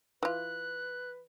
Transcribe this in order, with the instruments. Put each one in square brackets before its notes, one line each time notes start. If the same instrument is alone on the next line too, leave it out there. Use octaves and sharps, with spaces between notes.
[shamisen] E3 F4 [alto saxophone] B4 [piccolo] F#6